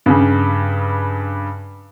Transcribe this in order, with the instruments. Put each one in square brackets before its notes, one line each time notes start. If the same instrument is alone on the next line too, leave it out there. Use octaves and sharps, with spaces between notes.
[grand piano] G2 C#3